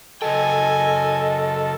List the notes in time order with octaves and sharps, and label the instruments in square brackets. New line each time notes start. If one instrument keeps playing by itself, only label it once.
[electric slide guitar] C#3 F#3 G5 [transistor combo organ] A4 [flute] D#5 [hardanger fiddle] G#5